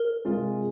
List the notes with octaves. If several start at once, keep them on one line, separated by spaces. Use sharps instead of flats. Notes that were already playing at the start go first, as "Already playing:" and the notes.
Already playing: A#4
C3 G#3 F4 G#4